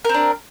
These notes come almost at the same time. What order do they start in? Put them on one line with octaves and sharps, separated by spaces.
A#4 C4 D4